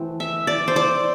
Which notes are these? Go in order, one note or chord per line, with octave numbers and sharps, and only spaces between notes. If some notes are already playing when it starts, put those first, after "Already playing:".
Already playing: E3 A3 C4
E5
D5
C5
D5